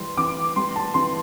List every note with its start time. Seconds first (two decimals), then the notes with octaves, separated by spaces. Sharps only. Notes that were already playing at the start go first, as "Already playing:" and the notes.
Already playing: E3 G3 C6
0.17 E3 D6
0.56 G3 C6
0.76 A5
0.94 E3 C6